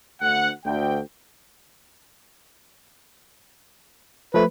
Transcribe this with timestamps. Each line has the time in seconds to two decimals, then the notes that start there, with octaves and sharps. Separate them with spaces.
0.21 D2 F#5
0.64 D2 G5
4.34 F3 A3 B4